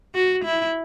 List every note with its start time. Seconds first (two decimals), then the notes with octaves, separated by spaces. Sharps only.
0.15 F#4
0.45 E4